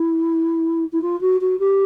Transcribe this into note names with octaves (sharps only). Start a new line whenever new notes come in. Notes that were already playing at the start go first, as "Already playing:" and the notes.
Already playing: E4
E4
F4
F#4
F#4
G4